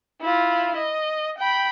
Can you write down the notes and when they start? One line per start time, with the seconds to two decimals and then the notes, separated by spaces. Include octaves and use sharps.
0.21 E4 F4
0.76 D#5
1.38 G5 B5